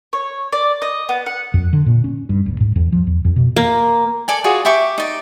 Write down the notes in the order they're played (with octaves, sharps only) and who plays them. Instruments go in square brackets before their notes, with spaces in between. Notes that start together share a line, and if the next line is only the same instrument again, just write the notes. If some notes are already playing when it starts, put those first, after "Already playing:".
[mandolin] C#5
D5
D#5
B3
F#5
[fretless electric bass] F2
D3
A#2
C#4
G2
D1
G#2
E2
F3
E2
F2
B2
[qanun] A#3
[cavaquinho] A4 D5 G#5
F4 F#4 G#4 D5
G4 E5 C#6 D6
D#4 D5